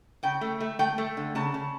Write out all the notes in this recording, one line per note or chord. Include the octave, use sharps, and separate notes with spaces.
C#3 G5
A3
A3
A3 G5
A3
D3
C#3 A5
C#3